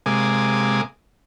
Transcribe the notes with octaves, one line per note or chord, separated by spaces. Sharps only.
C3 G#3 A#3 G#5 D6 D#6